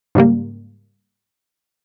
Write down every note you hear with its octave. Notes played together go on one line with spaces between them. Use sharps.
G#2 C#3 G3 A#3